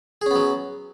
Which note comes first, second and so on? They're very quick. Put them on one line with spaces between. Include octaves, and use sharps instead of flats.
G#4 C#4 B3 F#3